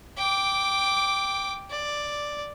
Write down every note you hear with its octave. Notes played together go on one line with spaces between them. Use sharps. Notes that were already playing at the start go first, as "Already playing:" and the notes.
G5 D6
D5